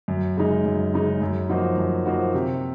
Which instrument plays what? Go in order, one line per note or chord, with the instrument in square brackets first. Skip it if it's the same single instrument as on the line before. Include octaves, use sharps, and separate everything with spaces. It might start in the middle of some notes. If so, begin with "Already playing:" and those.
[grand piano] F#2
C#3 G#3 D#4
F#2
C#3 G#3 D#4
F#2
F3 A#3 D#4 F#4
F#2
F3 A#3 D#4 F#4
C3